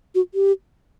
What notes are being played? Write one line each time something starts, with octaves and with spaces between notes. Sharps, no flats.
F#4
G4